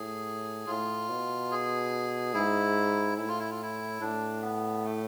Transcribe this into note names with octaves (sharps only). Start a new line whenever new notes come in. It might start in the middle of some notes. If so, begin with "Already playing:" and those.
Already playing: A2 G#4
A2 F4
B2
G#4
G#2 E4
A2 E4
F4
E4
F4
E4
A2 D4
B3
A3